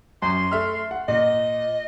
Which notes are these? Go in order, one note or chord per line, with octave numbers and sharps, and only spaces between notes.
F#2 C6
A3 E5 F6
F#5
A#2 D#5